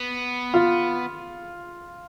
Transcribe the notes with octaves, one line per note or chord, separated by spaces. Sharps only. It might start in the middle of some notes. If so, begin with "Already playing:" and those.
Already playing: B3
F4